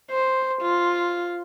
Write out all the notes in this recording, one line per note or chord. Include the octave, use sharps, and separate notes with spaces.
C5
F4